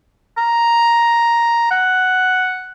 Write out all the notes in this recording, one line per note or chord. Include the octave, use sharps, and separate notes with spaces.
A#5
F#5